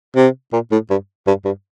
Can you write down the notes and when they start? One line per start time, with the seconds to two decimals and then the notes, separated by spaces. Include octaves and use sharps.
0.16 C3
0.53 A#2
0.72 A2
0.91 G2
1.27 G2
1.45 G2